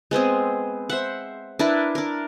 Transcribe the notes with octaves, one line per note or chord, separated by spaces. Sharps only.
G#3 B3 C4 G#4
C5 E5 F#5
D4 E4 A#4 B4
D4 A#4